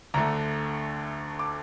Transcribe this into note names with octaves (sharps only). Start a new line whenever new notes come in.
D2 D3 A3 A#5
D6